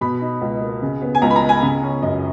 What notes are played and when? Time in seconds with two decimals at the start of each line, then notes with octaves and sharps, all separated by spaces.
0.01 B2 B5
0.21 D#4
0.42 C#2
0.61 A#3
0.82 C#3
1.02 B3
1.15 G#5
1.22 C#2 A#5
1.30 B5
1.36 A#5
1.42 G#3
1.49 G#5
1.62 C#3
1.83 C#4
2.02 F#2 D#5